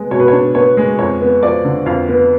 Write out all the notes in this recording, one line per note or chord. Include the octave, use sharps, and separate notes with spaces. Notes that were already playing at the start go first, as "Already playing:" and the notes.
Already playing: G#3 B3
B2 C#5
B4
D4 C#5
B3 C#5
G#3
F2 C#5
B3
F3 D5
D3
F2 F5
B3